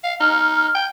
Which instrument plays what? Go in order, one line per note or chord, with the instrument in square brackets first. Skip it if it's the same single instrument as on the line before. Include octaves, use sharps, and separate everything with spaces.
[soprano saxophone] F5
[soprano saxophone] D#4 [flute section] F6
[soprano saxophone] G5